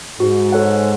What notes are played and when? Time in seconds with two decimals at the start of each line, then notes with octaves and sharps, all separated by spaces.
0.20 G#2 F#4
0.52 A4 C#5 F#5